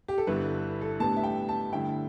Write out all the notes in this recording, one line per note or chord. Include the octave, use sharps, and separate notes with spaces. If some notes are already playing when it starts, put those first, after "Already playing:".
G4
A4
G1 G2 D3 G3 E4 B4
A4
A2 G3 B3 D4 A5
E5
G5
A5
G2 D3 A3 E4 G5